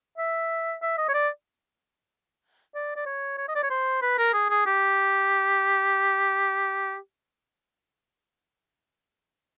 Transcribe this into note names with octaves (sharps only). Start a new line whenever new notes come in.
E5
E5
D#5
C#5
D5
D5
D5
C#5
C#5
D#5
D5
C#5
C5
B4
A#4
G#4
G#4
G4